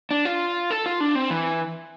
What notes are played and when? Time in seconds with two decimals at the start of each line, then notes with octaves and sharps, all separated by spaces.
0.11 D4
0.25 F4
0.71 A4
0.86 F4
1.00 D4
1.15 C4
1.30 E3